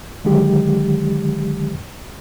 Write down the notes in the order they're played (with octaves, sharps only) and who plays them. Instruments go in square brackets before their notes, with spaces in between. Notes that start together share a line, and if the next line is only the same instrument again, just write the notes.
[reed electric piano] D3 D#3 F#3 G#3 G4